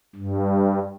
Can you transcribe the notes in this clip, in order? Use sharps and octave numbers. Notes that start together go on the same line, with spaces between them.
G2